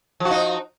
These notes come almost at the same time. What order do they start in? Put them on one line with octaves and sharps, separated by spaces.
F3 F#4 D#4